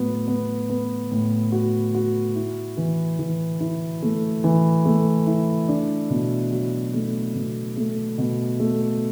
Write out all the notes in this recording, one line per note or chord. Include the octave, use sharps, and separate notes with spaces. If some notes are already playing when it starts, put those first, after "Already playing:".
Already playing: A2 F#3 B3
B3
B3
A2
F#4
F#4
E4
E3
E3
E4
A3
E3
A3
E4
D4
B2
F#3
A3
B2
A3
B2
A3